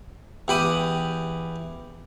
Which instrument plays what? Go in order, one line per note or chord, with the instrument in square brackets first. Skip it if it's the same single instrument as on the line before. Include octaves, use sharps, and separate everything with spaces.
[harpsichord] E2 G4 B5 D#6